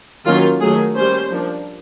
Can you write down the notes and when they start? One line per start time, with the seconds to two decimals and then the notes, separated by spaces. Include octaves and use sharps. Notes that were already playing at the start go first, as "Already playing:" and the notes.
0.25 D#3 F#3 A#3 C#4 F4
0.61 D#3 F#3 A3 G#4
0.96 G3 A#3 C#4 C5
1.31 F3 A#3 D4